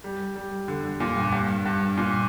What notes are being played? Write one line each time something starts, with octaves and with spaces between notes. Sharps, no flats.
G3
G3
D3
D3
A#2
G2
G2
G2
A#2